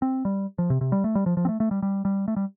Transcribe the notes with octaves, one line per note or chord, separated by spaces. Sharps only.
C4
G3
F3
C3
C3
G3
A3
G3
F3
F3
C4
A3
A3
G3
G3
G3
A3
G3